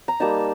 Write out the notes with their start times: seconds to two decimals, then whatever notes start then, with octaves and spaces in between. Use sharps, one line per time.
0.08 A#5
0.20 G3 A#3 D#4 A5